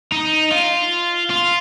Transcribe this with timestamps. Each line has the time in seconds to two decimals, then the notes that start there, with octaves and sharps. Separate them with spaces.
0.12 D#4
0.51 F4
1.30 F4